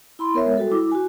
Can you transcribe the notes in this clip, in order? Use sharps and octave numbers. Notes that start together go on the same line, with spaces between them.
E4 B5 C6
B3 A#4 C#5 E5
G#3
G3 F#4 A4
E4 D6
F#4 G#5